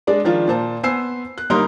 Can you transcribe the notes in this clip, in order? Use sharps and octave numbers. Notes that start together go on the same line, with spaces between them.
G#3 D4 D5
D#3 F3 D4 F4
A#2 C5 A5
B3 C5 G#5 E6 C7
F#6
G1 G3 A#3 D#4 A#4 C6